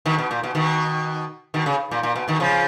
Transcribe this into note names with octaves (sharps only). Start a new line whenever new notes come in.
B2 D#3
B2
A#2
B2
B2 D#3
B2 D#3
C#3
A#2
A#2
B2
B2 D#3
C#3 F3